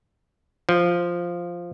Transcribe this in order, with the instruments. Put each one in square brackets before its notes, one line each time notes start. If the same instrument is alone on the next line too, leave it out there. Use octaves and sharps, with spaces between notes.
[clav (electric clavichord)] F3